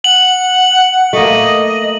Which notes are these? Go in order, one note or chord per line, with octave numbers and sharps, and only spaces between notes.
F#5 F#7
A3 A#3 D#5